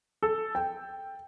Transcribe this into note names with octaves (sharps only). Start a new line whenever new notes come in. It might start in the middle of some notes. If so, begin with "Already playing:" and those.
A4
G5